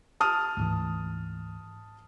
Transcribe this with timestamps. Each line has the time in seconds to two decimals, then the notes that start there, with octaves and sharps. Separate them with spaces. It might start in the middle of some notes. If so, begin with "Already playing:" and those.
0.20 A5 D#6 F6
0.57 D2 G#2 E3